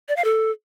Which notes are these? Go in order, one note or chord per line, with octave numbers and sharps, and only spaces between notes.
D5
F5
A4